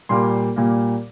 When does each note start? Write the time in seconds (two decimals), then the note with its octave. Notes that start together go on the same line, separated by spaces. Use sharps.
0.09 A#2 G3 A#3 C6
0.56 A#2 G3 A#3